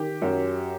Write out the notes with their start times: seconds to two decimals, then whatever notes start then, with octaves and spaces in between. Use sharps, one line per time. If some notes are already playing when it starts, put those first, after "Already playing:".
Already playing: D#3 G4 G5
0.22 F#2